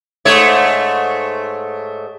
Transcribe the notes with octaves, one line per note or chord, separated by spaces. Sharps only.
G#2 A3 C#5